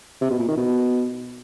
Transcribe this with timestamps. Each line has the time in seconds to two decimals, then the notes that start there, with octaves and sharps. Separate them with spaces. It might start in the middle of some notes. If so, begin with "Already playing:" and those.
0.21 C3
0.30 B2
0.39 A#2
0.48 D#3
0.57 B2